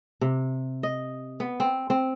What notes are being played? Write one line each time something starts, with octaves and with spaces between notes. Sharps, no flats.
C3
D#5
B3
C4
C4